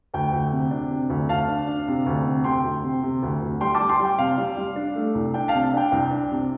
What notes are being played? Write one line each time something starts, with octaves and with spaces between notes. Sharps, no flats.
D2 G5
D2
C3
D4
C3
D2
D2 F5 A5
D4
D4
C3
D2
C3
C3 G5 C6
D2
C3
C3
D2
D2
G3 G5 C6
A5 D6
G3
G5 C6
G3
G5
C3 F5
G3
G3
D4
A3
C2
D4 G5
F5 A5
C3
D4 G5
C2
D4
C3